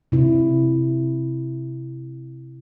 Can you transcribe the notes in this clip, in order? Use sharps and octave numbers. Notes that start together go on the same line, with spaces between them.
C3 E4